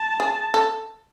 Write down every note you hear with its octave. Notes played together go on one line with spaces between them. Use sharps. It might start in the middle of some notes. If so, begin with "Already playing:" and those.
Already playing: A5
G#4
A4